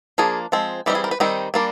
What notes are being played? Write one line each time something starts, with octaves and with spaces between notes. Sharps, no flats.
F3 A#3 D4 G#4
F3 G#3 C4
E3 G3 C4 D#4 G4
G#4
A#4
B4
D#3 G3 C4 D#4
G3 A#3 D4 D5